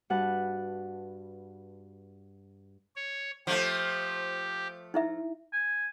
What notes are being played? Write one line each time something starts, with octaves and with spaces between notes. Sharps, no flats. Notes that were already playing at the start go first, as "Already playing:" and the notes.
G2 F#4 B4 F#5 A5 F#6
C#5
F3 A3 G4
D#4 E4 E5
G#5